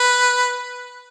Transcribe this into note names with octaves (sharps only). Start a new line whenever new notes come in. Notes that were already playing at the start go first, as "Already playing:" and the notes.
Already playing: B4